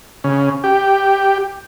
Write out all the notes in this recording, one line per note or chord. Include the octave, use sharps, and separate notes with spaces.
C#3
G4